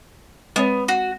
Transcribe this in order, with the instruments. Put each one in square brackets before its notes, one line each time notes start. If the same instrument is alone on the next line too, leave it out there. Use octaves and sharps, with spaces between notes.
[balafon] G#3 C4 C#5 [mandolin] B3
[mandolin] F#4